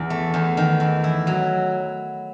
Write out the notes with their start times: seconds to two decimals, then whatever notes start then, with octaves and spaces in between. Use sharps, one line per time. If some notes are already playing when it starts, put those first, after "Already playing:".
Already playing: E2
0.10 A3
0.34 E2
0.57 D#3
0.80 E2
1.04 E4
1.27 F#3